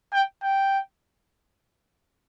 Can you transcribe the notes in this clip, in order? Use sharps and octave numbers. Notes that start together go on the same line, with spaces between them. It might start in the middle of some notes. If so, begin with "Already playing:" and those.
G5
G5